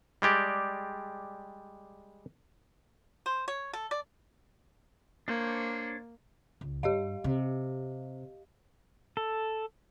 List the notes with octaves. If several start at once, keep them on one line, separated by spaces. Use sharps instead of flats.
G3 G#3 G4 D5
C5
C#5
A4
D5
A#3 D4 C5 C#5
C#2
G2 G4 D#5 F5
C3
A4